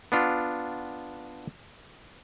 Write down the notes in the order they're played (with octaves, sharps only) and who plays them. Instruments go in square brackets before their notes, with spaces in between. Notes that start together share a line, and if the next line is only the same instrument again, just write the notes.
[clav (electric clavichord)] B3 D4 F4